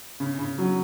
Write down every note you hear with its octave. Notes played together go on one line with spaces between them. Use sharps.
C#3
C#3
F#3